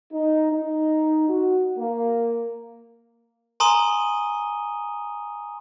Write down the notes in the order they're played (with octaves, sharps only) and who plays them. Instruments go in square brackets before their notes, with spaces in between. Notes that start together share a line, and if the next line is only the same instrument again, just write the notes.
[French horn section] D#4
D#4
F#4
A#3
[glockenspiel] G#5 A#5 C6 D#6 D#7 G7